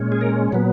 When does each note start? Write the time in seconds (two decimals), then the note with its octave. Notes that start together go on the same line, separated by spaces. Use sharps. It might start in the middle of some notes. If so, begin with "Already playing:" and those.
Already playing: A#2 G#3 C#4
0.12 G#4
0.21 A#4
0.52 A#2 F#3 B3